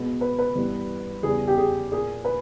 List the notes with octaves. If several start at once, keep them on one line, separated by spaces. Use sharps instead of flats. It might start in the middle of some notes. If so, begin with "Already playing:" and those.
Already playing: B2 G#3 B3
B4
B4
G2 E3 G3 B3
E2 C#3 G3 B3 G#4
G4
G#4
A#2 A#3 G#4
B4